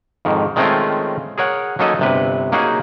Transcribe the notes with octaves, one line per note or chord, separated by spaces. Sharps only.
F2 G#2 D#3
D#3 G#3 A3 C4 C#4 F4
G#4 A#4 C#5 F#5
F#3 A#3 C#4 D#4 A4 D#5
G1 C3 B4
A#3 C#4 D#4 F#4 G#4